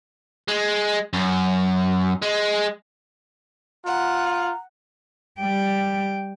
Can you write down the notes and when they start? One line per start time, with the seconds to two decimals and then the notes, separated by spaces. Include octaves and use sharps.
0.48 G#3
1.13 F#2
2.22 G#3
3.85 F4 F#5 A#5
5.40 G3 G5